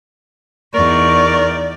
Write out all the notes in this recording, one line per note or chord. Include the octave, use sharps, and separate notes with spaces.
E2 D#4 A#4 D5 C#6